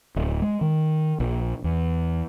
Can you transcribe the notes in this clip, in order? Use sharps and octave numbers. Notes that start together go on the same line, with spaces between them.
D1
G#3
D#3
A#1
E2